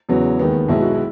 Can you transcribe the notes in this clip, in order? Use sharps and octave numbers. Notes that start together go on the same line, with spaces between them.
E2 C#3 F#3 B3
D#2 D#3 G#3 B3
B1 B2 G#3 B3 E4
F#4
E4